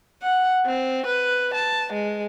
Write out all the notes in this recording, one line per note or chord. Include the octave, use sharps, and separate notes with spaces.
F#5
C4
B4
A5
G#3